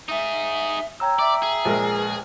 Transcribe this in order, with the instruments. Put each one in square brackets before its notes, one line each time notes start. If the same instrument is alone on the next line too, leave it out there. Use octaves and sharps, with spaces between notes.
[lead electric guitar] D#4 G#4 [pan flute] E5
[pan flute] C#5 [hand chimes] G5 A#5 E6
[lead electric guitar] D5 [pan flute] E5
[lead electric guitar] G#4
[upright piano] A#1 G#3 A#4
[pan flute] B4